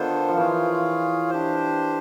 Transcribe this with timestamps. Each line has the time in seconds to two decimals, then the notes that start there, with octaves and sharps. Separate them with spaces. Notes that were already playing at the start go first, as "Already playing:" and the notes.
Already playing: D#3 B3 D4 F4 A4 C5
0.29 F3
0.37 E3 F4 G#4 C#5 F5
1.30 D4 G4 C5